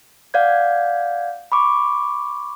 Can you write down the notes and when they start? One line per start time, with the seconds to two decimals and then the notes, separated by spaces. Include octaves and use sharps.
0.34 D5 F5 F#5 G6 G#6
1.52 B5 C#6 D6